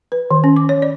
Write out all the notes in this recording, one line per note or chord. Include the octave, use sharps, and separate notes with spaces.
B4
D#3
C#4
D6
C#5
D5